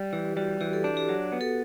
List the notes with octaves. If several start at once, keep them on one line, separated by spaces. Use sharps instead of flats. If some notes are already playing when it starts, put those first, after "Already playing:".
Already playing: G3
E3 G4
G3 F#4
E3 G4
A4
D4 G4
G4
F#3 F#4
B3
A4